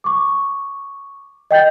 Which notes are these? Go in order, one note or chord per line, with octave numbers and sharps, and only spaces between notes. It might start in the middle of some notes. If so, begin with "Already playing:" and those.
C#6 D6
D#5 G5 G6 A6